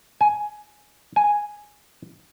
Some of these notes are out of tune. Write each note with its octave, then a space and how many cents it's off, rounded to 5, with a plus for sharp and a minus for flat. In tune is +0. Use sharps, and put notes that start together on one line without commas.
G#5 +10
G#5 +0